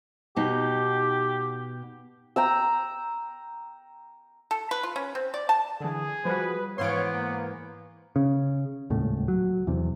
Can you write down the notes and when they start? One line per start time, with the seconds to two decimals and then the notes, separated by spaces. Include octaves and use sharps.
0.36 B2 D#4 G4
2.36 G5 A#5 E6
4.51 A4
4.71 B4
4.83 F4
4.96 C#4
5.15 C4
5.34 D5
5.49 A5
5.80 D3 E3 G#4
6.25 F3 G3 F#4 B4
6.78 G#2 E3 B3 C#5 F5 C6 D7
7.14 A#3
8.16 C#3
8.90 D#1 C#2 A2
9.28 F#3
9.67 E2 C3